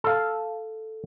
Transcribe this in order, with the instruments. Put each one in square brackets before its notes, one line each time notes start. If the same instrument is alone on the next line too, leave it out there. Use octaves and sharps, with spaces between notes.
[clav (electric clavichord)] A4 F5